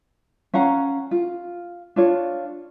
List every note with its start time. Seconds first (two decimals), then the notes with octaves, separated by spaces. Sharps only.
0.54 C#4 F5 F#5 A#5
1.11 F4
1.96 D4 F4 C#5